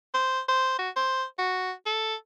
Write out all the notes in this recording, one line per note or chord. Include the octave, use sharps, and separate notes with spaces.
C5
C5
F#4
C5
F#4
A4